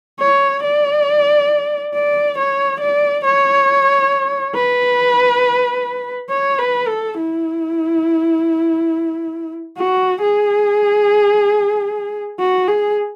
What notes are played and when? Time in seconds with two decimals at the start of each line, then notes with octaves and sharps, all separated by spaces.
0.20 C#5
0.63 D5
1.94 D5
2.38 C#5
2.81 D5
3.25 C#5
4.55 B4
6.30 C#5
6.59 B4
6.88 A4
7.17 E4
9.78 F#4
10.21 G#4
12.40 F#4
12.68 G#4